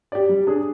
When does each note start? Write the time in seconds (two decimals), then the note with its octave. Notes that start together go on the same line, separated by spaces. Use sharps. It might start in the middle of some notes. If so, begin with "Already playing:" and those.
0.12 G4 D5
0.29 G3
0.47 D4 G#4